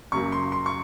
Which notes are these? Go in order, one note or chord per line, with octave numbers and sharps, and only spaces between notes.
F#2 C#3 F#3 A#3 C#6
C6
C6
C#6